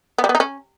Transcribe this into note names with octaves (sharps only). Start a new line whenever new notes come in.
B3
G3
B3
D#4
C#4